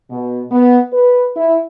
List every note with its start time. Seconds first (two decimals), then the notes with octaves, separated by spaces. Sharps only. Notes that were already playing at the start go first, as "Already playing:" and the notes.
0.10 B2
0.51 B3
0.93 B4
1.36 E4